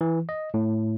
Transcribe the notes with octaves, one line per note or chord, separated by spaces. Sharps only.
E3
D#5
A2